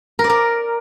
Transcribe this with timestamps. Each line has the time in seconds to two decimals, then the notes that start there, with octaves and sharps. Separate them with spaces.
0.19 A#4
0.24 D5
0.29 A#4